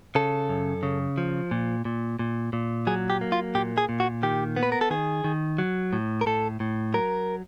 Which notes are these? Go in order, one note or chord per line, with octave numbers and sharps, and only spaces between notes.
C#3 A4
F#2
C#3
F3
A#2
A#2
A#2
A#2
F#3 G#4
G4
A#3
F4
A#2 G4
G#4
A#2
F#4
D#3 G4
B3
B4
A#4
A4
D#3 G#4
D#3
F#3
A2
A#4
A2 A4
A2
F#3 A#4